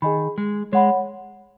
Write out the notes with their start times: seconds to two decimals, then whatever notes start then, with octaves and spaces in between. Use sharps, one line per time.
0.02 D#3 G#4 D#5 G#5 B5
0.38 G#3
0.72 G#3 C#5 F#5 B5